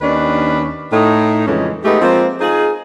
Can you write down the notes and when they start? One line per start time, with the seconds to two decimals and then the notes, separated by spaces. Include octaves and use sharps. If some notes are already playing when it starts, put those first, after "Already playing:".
0.02 D#2 D#3 C#4 D4 B4
0.93 A2 D#4
1.47 F2 C#3 E3 G#3 C#4
1.85 G#3 A3 B3 D#4 G4
2.02 F3 G#3 A#3 C4
2.41 D#4 F4 G#4